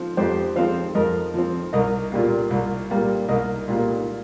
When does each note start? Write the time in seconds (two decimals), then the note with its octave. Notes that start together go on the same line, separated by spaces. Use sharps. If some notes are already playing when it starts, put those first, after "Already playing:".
Already playing: F3 C4
0.17 F2 G4 C5
0.56 F3 C4 C5 F5
0.95 F2 A#4 D#5
1.34 F3 C4
1.73 C2 A#4 D#5
2.12 A#2 G3 A#3
2.50 C2
2.90 A#2 G3 A#3
3.28 C2 A#4 D#5
3.68 A#2 G3 A#3